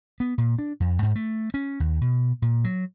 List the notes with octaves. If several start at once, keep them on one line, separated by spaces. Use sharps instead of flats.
B3
A#2
D4
F2
G#2
A3
C#4
D#2
B2
A#2
F#3